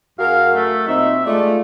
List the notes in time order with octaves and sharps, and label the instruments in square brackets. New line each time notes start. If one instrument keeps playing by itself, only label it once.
[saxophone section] F#2 G#4 A#4 [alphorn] F#4 [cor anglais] F5
[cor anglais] A3
[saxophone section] A#2 F#3 C4 [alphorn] D#4 [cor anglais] E5
[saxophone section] G#3 A3 [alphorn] F4 [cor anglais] D5